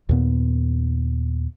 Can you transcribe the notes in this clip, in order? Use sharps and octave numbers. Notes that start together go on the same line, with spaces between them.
D#2 A#2 B3